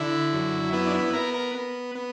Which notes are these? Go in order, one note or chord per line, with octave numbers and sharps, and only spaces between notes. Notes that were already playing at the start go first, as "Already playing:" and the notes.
Already playing: D3 E4
F#2
B3 E4
D4
E4
B3 A#4
A#4
B3
B3